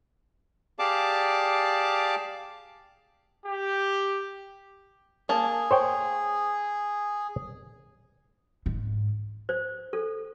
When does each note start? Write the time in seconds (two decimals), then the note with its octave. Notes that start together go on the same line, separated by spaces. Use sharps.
0.79 G4 G#4 D5 F5 A5 D6
3.45 G4
5.29 A#3 G#4 A5
5.71 C5 C#5 G5
8.66 G#2
9.49 C5
9.93 A4